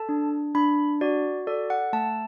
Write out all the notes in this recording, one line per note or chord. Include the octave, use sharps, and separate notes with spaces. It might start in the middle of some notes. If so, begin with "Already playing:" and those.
Already playing: A4 A5
D4
D4 B5
F#4 D5
A4 D5
F#5
A3 A5